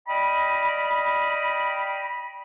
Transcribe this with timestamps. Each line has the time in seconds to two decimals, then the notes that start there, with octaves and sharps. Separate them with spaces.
0.07 D5 D#5 F5 G5 B5